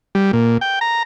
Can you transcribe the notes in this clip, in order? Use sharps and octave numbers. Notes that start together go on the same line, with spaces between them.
G3
A#2
G5
A#5